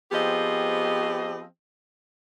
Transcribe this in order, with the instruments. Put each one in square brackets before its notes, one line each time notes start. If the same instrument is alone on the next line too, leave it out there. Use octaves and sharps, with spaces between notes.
[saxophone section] F3 B3 C4 G4 G#4 D#5